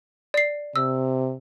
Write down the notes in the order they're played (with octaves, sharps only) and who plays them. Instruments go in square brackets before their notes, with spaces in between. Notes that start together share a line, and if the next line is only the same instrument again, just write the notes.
[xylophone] D5 C7
[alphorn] C3 [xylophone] E6